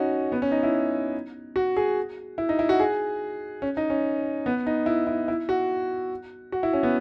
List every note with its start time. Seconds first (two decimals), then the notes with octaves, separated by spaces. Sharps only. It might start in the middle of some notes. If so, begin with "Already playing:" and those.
Already playing: C#4 D#4 F#4
0.32 B3
0.42 C#4
0.52 D#4
0.63 E4
1.56 F#4
1.77 G#4
2.38 E4
2.49 D#4
2.59 E4
2.69 F#4
2.80 G#4
3.62 C#4
3.77 D#4
3.90 C#4
4.46 B3
4.67 D#4
4.86 E4
5.07 E4
5.28 E4
5.49 F#4
6.52 F#4
6.63 E4
6.73 C#4
6.83 B3